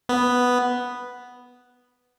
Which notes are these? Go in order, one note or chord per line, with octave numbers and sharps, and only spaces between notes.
B3